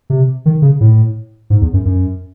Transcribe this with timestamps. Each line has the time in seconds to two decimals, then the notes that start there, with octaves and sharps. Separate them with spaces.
0.10 C3
0.46 D#3
0.62 C#3
0.81 A2
1.50 G#2
1.61 E2
1.74 F#2
1.85 F#2